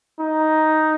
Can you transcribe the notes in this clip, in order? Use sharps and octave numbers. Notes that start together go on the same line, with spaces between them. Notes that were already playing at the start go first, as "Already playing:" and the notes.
D#4